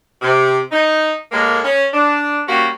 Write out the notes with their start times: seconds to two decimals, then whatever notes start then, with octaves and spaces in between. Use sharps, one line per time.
0.22 C3
0.72 D#4
1.32 A2 G#3 A#3
1.64 C#4
1.93 D4
2.48 G3 A#3 C#4 F#4